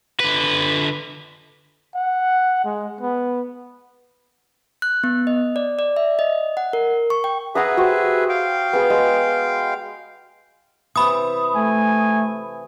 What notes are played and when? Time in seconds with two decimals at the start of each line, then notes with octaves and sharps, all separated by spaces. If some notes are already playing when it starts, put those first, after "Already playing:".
0.20 D3 B4
1.95 F#5
2.65 G#3
3.01 B3
4.82 F#6
5.04 B3
5.27 D#5
5.56 D5
5.79 D5
5.97 E5
6.19 D#5
6.57 F#5
6.73 A#4
7.10 C#6
7.24 G5
7.55 G#4 B4 E5 F#5 A#5 D#6
7.77 F#4 G4 C5
8.29 F5 G5
8.73 B3 G#4
8.90 G#3
10.96 C3 E3 B5 D#6
11.55 A3 G#5